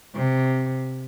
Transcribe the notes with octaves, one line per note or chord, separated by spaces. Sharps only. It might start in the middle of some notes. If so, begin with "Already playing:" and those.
C3